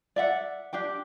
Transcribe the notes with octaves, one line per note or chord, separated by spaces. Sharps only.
D5 E5 F#5
D4 G4 G5